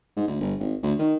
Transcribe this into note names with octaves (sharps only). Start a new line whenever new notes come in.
G#2
D2
G1
G#1
D2
D#3